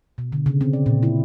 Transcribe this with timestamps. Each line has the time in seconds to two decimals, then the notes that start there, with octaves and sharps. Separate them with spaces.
0.18 B2
0.32 D3
0.46 C#3
0.61 C4
0.73 D5
0.86 A#2
1.03 E4